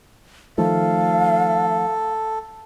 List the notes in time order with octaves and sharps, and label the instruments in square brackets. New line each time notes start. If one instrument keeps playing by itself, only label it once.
[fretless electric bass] D#3 F3 A3 [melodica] A4 [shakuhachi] F5